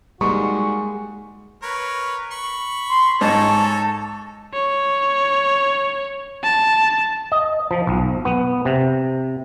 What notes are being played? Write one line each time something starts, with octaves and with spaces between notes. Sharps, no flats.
G3 G#3 A#3 D#4 F#4 C#6
A#4 B4 C#5
B5 C#6
C6
G#2 D#4 A4 C#5 A5
C#5
A5
D#5
F3
B1
B3
C3